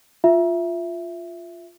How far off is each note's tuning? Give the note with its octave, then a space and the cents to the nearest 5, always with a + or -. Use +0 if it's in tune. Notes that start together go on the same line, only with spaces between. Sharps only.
F4 +0 E5 +10